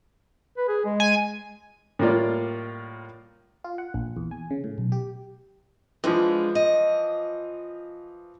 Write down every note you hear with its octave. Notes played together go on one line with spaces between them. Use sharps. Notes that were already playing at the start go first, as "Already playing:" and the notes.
B4
G#4
G#3
G#5
A2 G3 A#3 F4 D5
F4
F#5
A#1
E2
G#5
C#3
A2
B1
G4
E3 F3 G#3 D4 F4
D#5